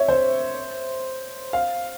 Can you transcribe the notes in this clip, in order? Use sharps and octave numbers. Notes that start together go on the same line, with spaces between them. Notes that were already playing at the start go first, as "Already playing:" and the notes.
Already playing: C#5 E5
C5
F5